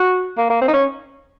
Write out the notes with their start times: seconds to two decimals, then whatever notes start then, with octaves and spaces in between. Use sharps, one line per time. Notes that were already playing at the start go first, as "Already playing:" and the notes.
Already playing: F#4
0.38 A#3
0.50 A#3
0.61 C4
0.68 D#4
0.74 C#4